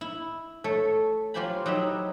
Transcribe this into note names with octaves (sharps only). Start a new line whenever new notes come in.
E4
A3 A4 C#5
F#3 F4 G4 C5 G#5 B5
F#3 D#4 E4 G4 E5